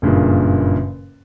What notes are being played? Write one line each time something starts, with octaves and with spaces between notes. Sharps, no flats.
F#1 G2 A#2 C#3